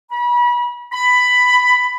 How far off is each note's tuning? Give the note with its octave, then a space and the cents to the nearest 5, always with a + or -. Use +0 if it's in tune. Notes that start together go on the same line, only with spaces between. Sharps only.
B5 -35
B5 +10